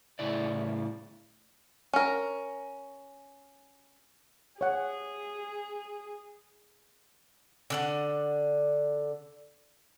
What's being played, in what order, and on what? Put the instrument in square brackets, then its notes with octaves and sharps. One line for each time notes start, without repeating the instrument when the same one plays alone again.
[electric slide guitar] A2 C#3 E4 D5
[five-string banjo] C#4 A#4
[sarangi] G#4 [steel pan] C#5 F#5
[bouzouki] D3 D4 F#5